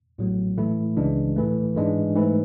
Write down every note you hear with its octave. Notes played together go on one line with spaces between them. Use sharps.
A1 A2 F#3 B3
A2 E3 A3 E4
C#2 C#3 E3 G#3 D4
A2 E3 A3
G#2 E3 G#3 D4
G#2 E3 A3 E4